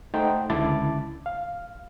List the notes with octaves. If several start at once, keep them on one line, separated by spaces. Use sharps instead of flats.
A3 D#4 C5 F#5 G5
C#2 D3 E4 A5 D6 A6
F5